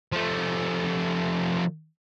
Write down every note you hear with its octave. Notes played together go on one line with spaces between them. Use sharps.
F3 A3